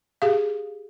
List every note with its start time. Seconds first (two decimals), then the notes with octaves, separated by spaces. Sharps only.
0.22 G4 G#4 F5